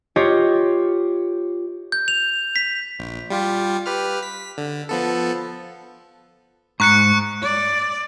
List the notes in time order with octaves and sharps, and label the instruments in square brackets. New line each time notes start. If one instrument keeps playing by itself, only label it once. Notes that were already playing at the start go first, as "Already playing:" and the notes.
[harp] F4 G4 C#5 D#5
[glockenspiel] G6
F7
B6
[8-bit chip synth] A#1
G3 F4 G4
G4 B4 F6
B6
D3
F3 B3 A4
[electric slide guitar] G#2 A#5 [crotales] C#6 F#6 C#7
[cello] D5